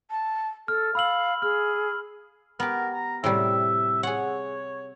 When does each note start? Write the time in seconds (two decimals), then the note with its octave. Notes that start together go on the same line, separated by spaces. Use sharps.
0.10 A5
0.68 A4 F6
0.95 F5 B5 E6 F#7
1.42 G#4 F6
2.60 B3 G4 A#4
2.93 A#5
3.24 A2 C3 G3 E5
4.03 G#4 C#5 F#5